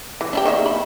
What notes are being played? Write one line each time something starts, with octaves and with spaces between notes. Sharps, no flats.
E3
D4 E4 G4
D#3 A#3 E5
B5